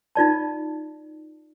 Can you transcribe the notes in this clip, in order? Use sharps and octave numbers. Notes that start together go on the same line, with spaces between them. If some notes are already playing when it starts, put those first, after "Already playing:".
D#4 F4 D5 A5